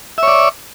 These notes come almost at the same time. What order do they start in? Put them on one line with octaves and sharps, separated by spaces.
E5 C#5 D5